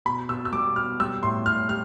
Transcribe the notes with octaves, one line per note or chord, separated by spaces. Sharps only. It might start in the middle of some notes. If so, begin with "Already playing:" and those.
B2 B5
B2 E6
E6
G3 D6
B2 F6
G3 E6
A2 C6
A2 F6
G3 F6